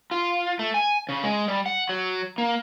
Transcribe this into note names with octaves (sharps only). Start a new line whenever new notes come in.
F4
A3
G#5
C#3
G#3
G3
F#5
F#3
A#3